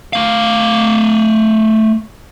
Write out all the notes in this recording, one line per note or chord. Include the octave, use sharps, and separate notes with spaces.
A3 F5